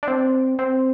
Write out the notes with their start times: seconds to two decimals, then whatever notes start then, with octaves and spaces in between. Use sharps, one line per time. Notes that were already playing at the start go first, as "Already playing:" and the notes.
0.03 D4
0.08 C4
0.59 C4